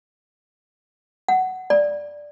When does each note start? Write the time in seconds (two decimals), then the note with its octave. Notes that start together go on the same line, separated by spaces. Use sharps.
1.28 F#5
1.70 D5